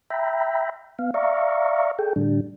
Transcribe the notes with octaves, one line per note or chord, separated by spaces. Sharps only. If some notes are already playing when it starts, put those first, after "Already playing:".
E5 G5 A#5 B5
B3 F5
D5 E5 F5 A#5 C#6
G#4 A4 G5
A2 D3 G3 D4